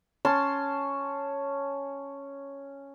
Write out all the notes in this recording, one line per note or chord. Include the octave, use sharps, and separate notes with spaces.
C#4 A5 C6